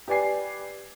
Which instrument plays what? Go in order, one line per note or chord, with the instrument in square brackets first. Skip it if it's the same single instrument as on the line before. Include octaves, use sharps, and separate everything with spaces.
[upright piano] G4 B4 D5 G#5 C7